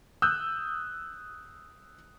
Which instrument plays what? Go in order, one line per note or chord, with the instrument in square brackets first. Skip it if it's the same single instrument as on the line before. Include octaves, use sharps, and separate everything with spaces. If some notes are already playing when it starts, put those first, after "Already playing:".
[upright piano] D#6 E6 F#6 G6